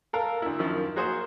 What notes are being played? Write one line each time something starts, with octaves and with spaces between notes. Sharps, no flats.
A4 A#4 F5
D2 E4
F#2 D#3 F3
A#3 F#4 G#4 C5 D#6